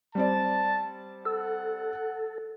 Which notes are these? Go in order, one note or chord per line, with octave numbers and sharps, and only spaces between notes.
G3 C4 D5 A5
A4 F#5